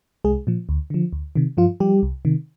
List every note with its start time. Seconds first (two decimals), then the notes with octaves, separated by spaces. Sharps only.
0.24 C2 G#3 G#4
0.47 A#2 F3
0.69 D2
0.90 D3 F3
1.13 D2
1.36 C3 D#3
1.57 G2 F3 F4
1.80 F3 G3 G4
2.03 C2
2.25 C3 D#3